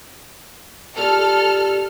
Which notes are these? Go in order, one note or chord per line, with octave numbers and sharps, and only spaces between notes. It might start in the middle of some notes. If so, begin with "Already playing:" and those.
A#2 G3 A4 F6